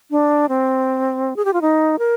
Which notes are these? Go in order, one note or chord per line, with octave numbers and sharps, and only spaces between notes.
D4
C4
G#4
G4
F4
D#4
A#4